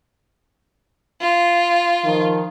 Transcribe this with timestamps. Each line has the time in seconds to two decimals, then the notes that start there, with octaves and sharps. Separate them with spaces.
1.21 F4
2.05 D#3 F3